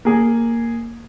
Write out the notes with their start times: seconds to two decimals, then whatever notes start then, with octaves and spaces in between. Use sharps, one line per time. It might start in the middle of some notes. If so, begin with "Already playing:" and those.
0.05 A#3 G#4